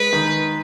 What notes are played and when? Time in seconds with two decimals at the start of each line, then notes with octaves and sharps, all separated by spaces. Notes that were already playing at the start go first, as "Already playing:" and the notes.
Already playing: G#3 B4
0.13 D#3